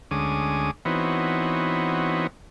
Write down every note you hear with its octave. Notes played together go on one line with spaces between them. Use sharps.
D2 G#3 C#4 D6 D#6
E3 B3 C4 D#4 F#4 C#5